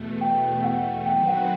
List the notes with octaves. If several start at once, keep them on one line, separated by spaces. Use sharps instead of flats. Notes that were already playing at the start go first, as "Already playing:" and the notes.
Already playing: E2 B2 A3
G5
F#5
D#3 F#3 C4 F#4 B4 G5
F#5